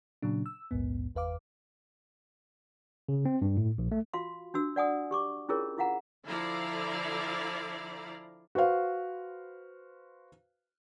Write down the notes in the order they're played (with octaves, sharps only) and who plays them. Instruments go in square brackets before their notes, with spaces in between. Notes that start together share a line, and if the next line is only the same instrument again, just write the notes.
[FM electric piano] A#2 C#3 F#3 D4
E6
A#1 D#2 G#2 B3
G1 E2 B4 F5 D6
[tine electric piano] C#3
C4
G2
A2
A#1
A3
[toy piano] F4 F#4 F5 C6
D4 F#4 E6
D5 F#5 G#5 D#6
G4 C#6 D6
C#4 E4 F4 G#4 A#4 C#5
E4 F4 F5 F#5 A#5
[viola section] D3 F3 E4 D5 F5 A#5
[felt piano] F#4 B4 C5 F5